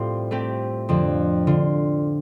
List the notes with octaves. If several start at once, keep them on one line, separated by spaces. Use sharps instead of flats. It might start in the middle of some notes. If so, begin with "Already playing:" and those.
Already playing: A2 G3 C4 F4 C5
A3 C4 G4
F2 D3 F3
D3 F4